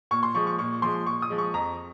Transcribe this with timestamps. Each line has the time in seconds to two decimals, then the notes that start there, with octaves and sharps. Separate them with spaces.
0.11 A#2 C#6
0.23 C6
0.35 F3 G#3 C#6
0.47 C#6
0.58 A#2 C#6
0.82 F3 G#3 C6
1.06 A#2 C#6
1.22 D#6
1.30 F3 G#3
1.38 C#6
1.54 F2 A#5